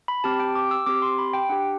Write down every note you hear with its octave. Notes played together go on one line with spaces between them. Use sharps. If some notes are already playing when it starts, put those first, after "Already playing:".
B5
C4 G4 A5
G5
D6
E6
C4 G4 D6
C6
B5
G5
D4 G4 F#5